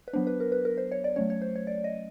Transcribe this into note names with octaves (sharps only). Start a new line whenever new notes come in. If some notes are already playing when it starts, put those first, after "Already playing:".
B4
F#3 B3 D4 C5
B4
A#4
B4
A#4
C5
C#5
D5
F#3 A3 C#4 C#5
C#5
C5
C#5
D5
D#5